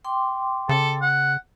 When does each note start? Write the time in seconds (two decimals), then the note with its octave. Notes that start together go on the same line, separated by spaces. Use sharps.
0.04 G5 C6 D6
0.69 C#3 A4
1.02 F#5